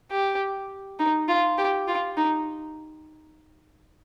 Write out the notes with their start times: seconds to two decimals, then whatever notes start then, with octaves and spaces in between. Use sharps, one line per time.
0.11 G4
0.99 D#4
1.28 F4
1.58 G4
1.88 F4
2.17 D#4